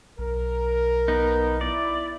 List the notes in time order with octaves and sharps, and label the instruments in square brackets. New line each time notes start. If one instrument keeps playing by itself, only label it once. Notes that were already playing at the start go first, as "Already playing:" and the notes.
[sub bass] B1 [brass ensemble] A#4
[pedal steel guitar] B3 D#4
[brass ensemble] E4 [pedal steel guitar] D5